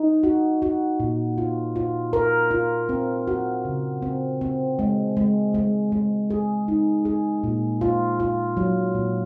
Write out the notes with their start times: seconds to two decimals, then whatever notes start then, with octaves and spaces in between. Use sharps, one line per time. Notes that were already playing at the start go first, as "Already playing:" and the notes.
Already playing: D#4
0.23 F#4
0.62 F#4
1.00 A#2
1.38 F4
1.76 F4
2.13 A#4
2.51 F4
2.89 C4
3.27 F#4
3.65 C#3
4.02 C4
4.41 C4
4.79 G#3
5.17 G#3
5.54 G#3
5.92 G#3
6.30 G#4
6.68 D#4
7.05 G#4
7.43 A#2
7.81 F4
8.20 F4
8.57 F#3
8.95 A#2